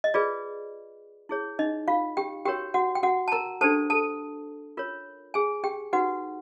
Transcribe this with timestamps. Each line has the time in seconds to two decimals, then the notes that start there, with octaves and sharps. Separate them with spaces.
0.04 D#5
0.14 F4 G#4 B4 D5
1.29 E4 G#4 C#5
1.59 D#4 D#5
1.88 F4 F5
2.17 G4 G5
2.45 F#4 G4 A#4 C#5 G5
2.74 F#4 F#5
2.95 G5
3.03 F#4 F#5
3.28 A5
3.32 A#4 A#5
3.61 D4 G4 A4 C5 A5
3.90 A4 A5
4.77 F4 A#4 C#5
5.34 G#4 G#5
5.64 G4 G5
5.93 D#4 F#4 G4 B4 F#5